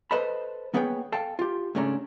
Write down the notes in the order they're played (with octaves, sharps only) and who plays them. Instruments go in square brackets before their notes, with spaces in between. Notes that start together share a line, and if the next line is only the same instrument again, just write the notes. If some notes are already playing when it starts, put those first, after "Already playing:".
[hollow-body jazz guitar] A4 B4 C5 D#5 A5 B5
A#3 B3 G#4 B4 C#5 G5
A4 F5 G5 A5
F4 G4
G#2 C#3 A3 C#4 D4 A#5